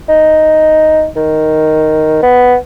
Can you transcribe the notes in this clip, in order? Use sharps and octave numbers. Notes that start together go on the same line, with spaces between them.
D#4
D#3
B3